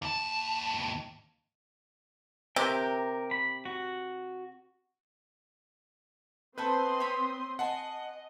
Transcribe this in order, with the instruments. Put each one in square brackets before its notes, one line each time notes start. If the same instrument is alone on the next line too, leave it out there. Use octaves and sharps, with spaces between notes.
[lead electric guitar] D#2 A5
[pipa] C3 G4 [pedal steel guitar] A#4 G5
[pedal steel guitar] B5
F#4
[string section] C4 C6 D#6 [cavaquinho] A4 E5 G5 [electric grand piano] B4
[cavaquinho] C#5 B5
[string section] D#5 [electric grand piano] F#5 [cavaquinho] G#5 A5 C6